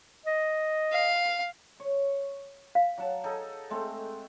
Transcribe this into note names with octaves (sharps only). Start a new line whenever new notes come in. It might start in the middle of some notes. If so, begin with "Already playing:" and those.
D#5
F5
C#5
F5
F#3 F#5 A5
D#4 G#4 A4
G#3 A3 C4